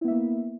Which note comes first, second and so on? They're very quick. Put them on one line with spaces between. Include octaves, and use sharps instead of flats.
E4 B3 E5 A#3